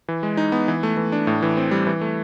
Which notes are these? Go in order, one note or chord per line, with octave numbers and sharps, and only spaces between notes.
E3
G#3
D#4
B3
E3
A3
E3
D4
A2
E3
C4
G3
E3
A3